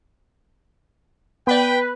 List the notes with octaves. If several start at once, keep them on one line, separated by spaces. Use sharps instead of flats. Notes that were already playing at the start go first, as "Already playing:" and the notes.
B3 B4 D5 G5